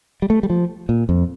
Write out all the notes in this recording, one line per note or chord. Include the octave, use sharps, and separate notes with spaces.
G3
A3
G3
F3
A#2
F2